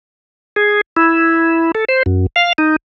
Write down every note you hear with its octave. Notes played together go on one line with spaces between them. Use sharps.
G#4
E4
A4
C5
F#2
F5
D#4